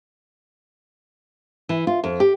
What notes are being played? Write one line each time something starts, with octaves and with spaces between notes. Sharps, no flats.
E3
F4
F2
G4